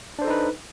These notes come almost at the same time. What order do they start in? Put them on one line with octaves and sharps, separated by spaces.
D4 C5 A4 D#4 B4